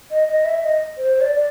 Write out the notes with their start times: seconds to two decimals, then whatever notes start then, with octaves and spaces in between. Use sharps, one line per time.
0.11 D#5
0.28 D#5
0.45 E5
0.63 D#5
0.98 C5
1.21 D5
1.36 D5